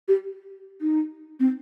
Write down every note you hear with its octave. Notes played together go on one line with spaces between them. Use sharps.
G4
D#4
C4